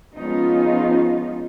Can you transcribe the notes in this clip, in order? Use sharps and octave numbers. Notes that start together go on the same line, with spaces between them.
F3 G#3 B3 C#4 D#4 F4